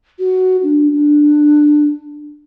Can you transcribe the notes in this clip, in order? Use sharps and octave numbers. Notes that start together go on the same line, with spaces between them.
F#4
D4
D4